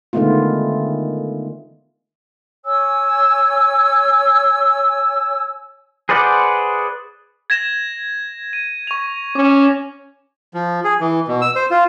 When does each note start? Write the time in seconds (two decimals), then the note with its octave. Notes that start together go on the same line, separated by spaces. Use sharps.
0.13 D3 D#3 G#3 A3 B3 F4
2.65 C#5 G#5 E6
6.09 G#4 B4 C5 D5 F#5
7.50 G#6 A#6 E7
8.53 D#7
8.87 C#6 F7
9.35 C#4 D6
10.54 F3
10.84 G#4
11.00 E3
11.28 B2
11.41 E6
11.56 C5
11.71 F4